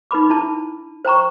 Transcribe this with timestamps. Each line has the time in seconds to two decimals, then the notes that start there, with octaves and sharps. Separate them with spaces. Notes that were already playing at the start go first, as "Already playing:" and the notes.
0.11 D#4 B4 B5 D6
0.29 D4 E4 A5
1.05 C5 G5 A#5 C#6